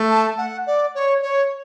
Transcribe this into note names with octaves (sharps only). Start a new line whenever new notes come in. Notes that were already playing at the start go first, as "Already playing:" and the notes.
Already playing: A3
A5
F#5
D5
C#5
C#5